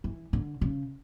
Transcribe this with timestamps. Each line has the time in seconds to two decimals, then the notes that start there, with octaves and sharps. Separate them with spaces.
0.04 E3
0.33 D3
0.61 C#3